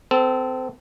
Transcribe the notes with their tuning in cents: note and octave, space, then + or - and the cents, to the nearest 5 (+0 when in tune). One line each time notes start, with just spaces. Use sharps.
C4 -30 A4 +0